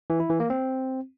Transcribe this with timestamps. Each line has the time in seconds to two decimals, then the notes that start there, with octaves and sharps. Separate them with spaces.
0.10 E3
0.20 E4
0.30 E3
0.40 A#3
0.50 C4